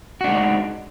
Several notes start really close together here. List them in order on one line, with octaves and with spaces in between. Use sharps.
F#4 D4 G#3 D#4